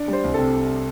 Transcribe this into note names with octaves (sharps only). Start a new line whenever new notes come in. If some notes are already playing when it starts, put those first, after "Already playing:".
Already playing: D4 D5
G3 C5
C2
C3 A4